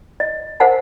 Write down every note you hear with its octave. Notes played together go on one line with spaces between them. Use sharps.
D#5
A#4 C5 F5 F#5 G#5 A5